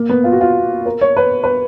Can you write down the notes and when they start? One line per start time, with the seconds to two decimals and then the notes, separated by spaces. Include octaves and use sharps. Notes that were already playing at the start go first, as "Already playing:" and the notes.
Already playing: A#3
0.09 B3
0.24 F4
0.32 F#4
0.41 F4
0.85 A#4
1.01 C#5
1.17 B4
1.44 B4